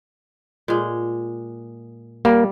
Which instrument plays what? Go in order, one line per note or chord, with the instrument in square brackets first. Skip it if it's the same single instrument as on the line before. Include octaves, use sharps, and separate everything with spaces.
[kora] A#2 G#3
[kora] G3 [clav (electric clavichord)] A#3